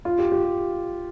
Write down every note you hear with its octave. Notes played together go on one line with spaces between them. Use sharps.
F4
G4
G4